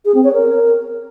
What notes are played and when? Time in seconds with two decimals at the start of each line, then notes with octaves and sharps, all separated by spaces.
0.05 G#4
0.14 C4
0.24 C#5
0.33 A#4